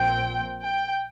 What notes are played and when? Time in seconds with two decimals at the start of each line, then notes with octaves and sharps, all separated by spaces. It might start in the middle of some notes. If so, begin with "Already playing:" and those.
Already playing: A#1 A#2 F3 C4 G5
0.63 G5